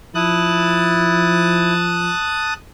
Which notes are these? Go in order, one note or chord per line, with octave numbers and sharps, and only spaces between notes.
F3 E4 A5 D#6 F#6